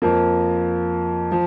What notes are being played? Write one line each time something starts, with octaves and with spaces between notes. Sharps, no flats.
F2 F3 A#3
F3